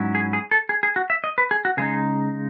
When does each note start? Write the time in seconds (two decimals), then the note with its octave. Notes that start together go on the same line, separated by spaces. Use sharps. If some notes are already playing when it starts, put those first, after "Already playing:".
Already playing: G#2 F#3 C#4 E4
0.15 G#4
0.33 G#4
0.51 A4
0.69 G#4
0.83 G#4
0.96 F#4
1.10 E5
1.24 D#5
1.38 B4
1.51 G#4
1.65 F#4
1.77 C#3 G#3 D#4 G#4